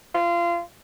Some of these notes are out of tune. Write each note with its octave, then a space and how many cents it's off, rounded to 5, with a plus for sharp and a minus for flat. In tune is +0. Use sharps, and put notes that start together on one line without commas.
F4 -25